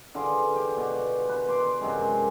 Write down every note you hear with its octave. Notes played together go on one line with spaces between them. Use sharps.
D3 F4 G#4 B4
G4
B2
B4
C6 D6
F#2 C3 G#3